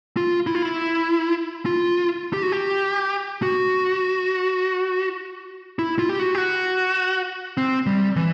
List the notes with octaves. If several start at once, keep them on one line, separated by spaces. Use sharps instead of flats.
F4
E4
F4
E4
F4
G4
F#4
G4
F#4
E4
F4
G4
F#4
G4
F#4
C4
G3
E3